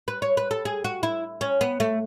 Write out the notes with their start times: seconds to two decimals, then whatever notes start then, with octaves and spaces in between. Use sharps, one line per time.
0.08 B4
0.22 C#5
0.37 B4
0.51 A4
0.65 G#4
0.85 F#4
1.03 E4
1.41 C#4
1.61 B3
1.80 A3